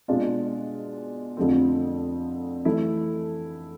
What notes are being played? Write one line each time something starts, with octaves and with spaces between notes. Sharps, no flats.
B2 G#3 D4 F4
F2 D3 F3 A3 C4
E3 A3 E4